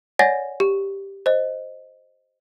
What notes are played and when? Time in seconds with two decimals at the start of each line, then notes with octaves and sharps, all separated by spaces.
0.19 C#5 D5 F#5 G#5 A6 A#6
0.60 G4
1.26 C5 D#5